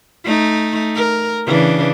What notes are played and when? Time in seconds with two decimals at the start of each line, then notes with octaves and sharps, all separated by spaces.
0.25 A3 D#4
0.95 A#4
1.46 C#3 E3 D4